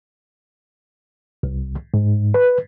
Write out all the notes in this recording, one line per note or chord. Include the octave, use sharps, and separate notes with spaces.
C2
G#2
B4